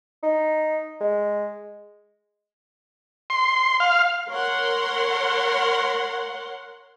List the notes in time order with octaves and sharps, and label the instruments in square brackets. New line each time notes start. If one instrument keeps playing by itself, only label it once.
[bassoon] D#4
G#3
[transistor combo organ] C6
F5
[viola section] A#4 C#5 F#5 C6